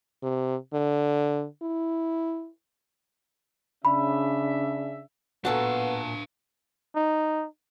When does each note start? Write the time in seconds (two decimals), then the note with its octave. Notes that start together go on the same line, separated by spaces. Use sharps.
0.23 C3
0.74 D3
1.62 E4
3.85 C#3 D4 E5 B5
5.45 A#2 B3 C4 D4 F#4 A4 F5 A5
6.95 D#4